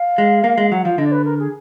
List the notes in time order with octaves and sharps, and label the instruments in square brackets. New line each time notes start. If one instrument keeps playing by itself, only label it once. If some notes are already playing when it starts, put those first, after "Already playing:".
Already playing: [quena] F5
[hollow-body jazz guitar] G#3
A#3
G#3
[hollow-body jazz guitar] F#3 [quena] F#5
[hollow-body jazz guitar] F3 [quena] F5
[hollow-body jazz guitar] D3 [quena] D#5
[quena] D5
B4
A#4
G#4